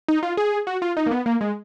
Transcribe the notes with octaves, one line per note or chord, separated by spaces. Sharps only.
D#4
F4
G#4
F#4
F4
D#4
A#3
B3
A#3
G#3